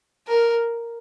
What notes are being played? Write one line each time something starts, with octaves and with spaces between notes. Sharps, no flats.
A#4